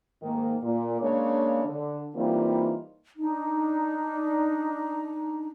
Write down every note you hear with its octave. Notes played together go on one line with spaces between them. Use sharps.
G#2 D#3 A#3
A#2
C#3 G#3 A#3 D4 C#5
D3
E3 G3 A#3 C4 D#4 F4
D4 D#4